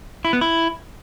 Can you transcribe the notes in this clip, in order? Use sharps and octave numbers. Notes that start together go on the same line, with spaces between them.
E4
B3
E4